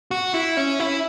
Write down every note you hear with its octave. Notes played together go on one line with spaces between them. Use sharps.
F#4
E4
C#4
E4